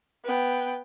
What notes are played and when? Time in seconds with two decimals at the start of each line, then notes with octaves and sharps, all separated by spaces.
0.25 B3 G5